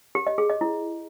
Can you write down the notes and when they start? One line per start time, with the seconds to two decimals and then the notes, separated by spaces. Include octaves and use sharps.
0.15 G4
0.27 D#5
0.38 G#4
0.50 D#5
0.61 E4